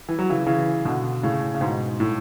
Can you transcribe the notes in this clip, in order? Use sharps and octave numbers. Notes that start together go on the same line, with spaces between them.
E3
F#3
C#3 E3
C#3 E3
B2 D3
A2 C#3
C#3
G#2 B2
A2